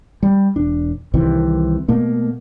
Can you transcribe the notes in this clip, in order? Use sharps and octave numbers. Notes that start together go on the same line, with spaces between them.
G3
E1 D4
C2 C3 D#3 E3
B2 A3 A#3